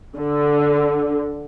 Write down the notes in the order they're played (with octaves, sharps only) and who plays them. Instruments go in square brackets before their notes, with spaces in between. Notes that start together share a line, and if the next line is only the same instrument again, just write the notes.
[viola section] D3